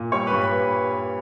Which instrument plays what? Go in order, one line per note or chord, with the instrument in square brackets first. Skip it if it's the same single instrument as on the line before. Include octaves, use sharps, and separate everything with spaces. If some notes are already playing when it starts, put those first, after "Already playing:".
Already playing: [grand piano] A#2
G3 C#5 C#6
G2 B4 B5
B4 B5